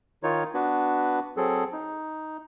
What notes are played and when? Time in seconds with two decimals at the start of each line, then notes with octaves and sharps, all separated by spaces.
0.23 D#3 D#4 F4 C#5
0.54 B3 D4 F#4 B4
1.37 F#3 C4 G#4 A4
1.73 D#4